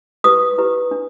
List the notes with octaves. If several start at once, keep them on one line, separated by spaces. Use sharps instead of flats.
E4 G4 B4 D#6
E4 G4 B4
D4